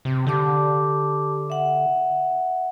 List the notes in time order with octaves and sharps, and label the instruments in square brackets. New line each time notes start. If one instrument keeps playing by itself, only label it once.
[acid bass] C3
[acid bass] D3 [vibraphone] G4 A5 D6
[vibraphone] E5 F#5